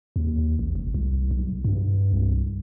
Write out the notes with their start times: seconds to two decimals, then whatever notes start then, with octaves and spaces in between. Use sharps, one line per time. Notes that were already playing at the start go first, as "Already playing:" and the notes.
0.16 D#2
0.59 A1
0.75 F1
0.94 C2
1.31 B1
1.65 G2
2.12 C2